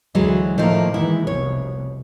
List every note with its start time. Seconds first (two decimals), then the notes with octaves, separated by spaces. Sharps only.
0.15 D2 E3 F#3 G#3
0.58 A2 D#3 F3 A3 A#3
0.94 D#3 E3 G#3 E4
1.27 F1 C2 B2 C#5